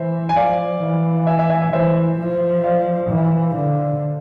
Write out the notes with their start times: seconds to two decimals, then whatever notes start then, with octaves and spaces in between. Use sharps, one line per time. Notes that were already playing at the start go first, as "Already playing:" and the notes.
Already playing: E3 C5 E5
0.29 G#5
0.36 F3 D5 F5
0.82 E3
1.27 E5 G#5
1.38 E5 G#5
1.50 E5 G#5
1.61 E5 G#5
1.73 E3 C5 E5
2.18 F3
2.64 D5 F5
3.10 E3
3.56 D3